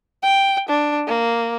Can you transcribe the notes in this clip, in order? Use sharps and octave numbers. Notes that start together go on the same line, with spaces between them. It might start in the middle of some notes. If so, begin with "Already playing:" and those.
G5
D4
A#3